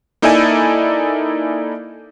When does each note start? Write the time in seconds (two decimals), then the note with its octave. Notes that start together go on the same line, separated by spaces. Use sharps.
0.22 A#3 D#4 E4 A4 D5 G#5